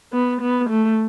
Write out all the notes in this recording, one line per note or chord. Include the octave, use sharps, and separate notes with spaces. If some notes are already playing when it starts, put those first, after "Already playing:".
B3
B3
A3